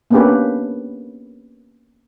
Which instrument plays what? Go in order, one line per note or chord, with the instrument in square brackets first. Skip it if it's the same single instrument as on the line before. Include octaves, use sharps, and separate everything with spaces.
[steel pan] A#3 B3 C#4 D4 G4 B4